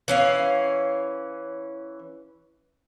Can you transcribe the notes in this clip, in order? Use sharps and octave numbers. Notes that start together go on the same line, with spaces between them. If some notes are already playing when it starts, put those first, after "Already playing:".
E3 C#4 F5